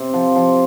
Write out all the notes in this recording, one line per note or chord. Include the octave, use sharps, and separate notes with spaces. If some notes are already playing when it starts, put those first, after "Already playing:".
Already playing: C3
F3
F3